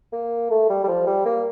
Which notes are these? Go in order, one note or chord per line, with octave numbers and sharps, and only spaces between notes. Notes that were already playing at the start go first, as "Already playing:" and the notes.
A#3
A3
G3
G3
F3
G3
A#3